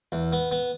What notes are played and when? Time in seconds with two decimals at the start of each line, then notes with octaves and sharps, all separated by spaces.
0.12 E2
0.32 B3
0.51 B3